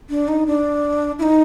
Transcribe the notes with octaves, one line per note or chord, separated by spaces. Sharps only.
D4
D#4
D4
E4
D#4